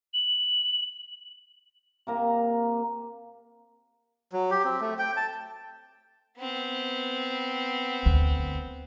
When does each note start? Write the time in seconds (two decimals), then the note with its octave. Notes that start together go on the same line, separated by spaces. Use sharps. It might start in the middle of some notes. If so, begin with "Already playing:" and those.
0.14 F#7
2.07 C3 A#3 A#5
4.32 F#3
4.51 G4
4.65 C4
4.81 A3
4.99 G5
5.17 A5
6.39 B3 C4
8.06 D2